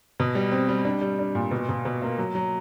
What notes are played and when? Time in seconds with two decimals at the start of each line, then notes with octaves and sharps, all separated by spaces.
0.20 B2
0.35 G3
0.52 C4
0.69 G3
0.85 D4
1.01 G3
1.19 D4
1.35 A#2
1.51 B2
1.69 B2
1.85 B2
2.02 A#3
2.18 F#3
2.35 F#3